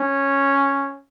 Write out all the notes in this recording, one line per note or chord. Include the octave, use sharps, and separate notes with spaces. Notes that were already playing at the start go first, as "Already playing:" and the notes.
Already playing: C#4